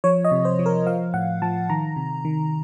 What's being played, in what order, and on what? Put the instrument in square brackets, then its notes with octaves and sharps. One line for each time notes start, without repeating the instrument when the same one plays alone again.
[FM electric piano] F3 C#5
D#5
C3
C5
F3
A#4
F3 F5
A2 F#5
F3 A5
D#3 A#5
C3
D#3